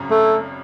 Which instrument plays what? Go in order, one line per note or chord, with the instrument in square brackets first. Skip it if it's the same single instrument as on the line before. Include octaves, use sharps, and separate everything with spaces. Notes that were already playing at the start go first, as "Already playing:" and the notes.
Already playing: [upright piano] G#1 F#2 C#3
[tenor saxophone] A3